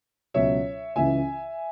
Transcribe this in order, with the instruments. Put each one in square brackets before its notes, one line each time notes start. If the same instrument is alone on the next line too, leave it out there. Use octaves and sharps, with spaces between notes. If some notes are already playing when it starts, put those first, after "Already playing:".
[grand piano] C#2 B2 F#3 C#4 C#5 E5
C#2 C#3 E3 E5 G#5